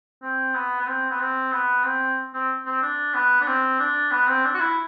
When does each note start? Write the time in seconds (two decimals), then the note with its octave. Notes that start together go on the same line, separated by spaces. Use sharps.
0.22 C4
0.55 B3
0.81 B3
0.87 C4
1.10 B3
1.20 C4
1.52 B3
1.84 C4
2.34 C4
2.65 C4
2.82 D4
3.14 B3
3.41 D4
3.47 C4
3.79 D4
4.11 B3
4.28 C4
4.45 D4
4.54 F#4
4.60 E4